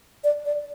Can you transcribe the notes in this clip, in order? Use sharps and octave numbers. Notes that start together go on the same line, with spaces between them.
D5
D5